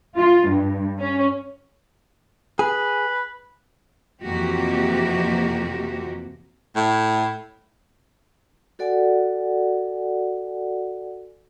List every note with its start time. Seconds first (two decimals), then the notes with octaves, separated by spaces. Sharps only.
0.17 F4
0.49 G2
0.99 C#4
2.59 G#4 B4
4.23 F2 C3 E3 A#3 F#4 G4
6.76 A2
8.79 F#4 A4 D5 F#5 G#5